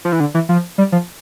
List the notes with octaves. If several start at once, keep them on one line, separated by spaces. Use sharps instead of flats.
F3
E3
D3
E3
F3
G3
F3